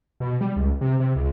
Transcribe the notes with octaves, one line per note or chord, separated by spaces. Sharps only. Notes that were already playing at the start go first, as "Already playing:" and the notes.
B2
G3
C#2
C3
C3
C#2